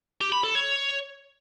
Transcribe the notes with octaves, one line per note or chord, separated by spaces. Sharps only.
G4
B5
A4
C#5